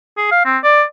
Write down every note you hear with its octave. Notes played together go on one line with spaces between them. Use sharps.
G#4
F5
C4
D5